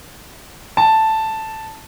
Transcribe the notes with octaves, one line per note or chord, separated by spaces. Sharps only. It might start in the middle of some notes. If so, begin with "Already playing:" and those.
A5